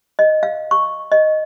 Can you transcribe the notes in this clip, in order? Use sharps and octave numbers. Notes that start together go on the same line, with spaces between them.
D#5
F5
C#6
D#5